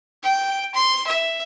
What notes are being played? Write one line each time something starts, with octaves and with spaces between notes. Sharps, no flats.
G5
C6
E5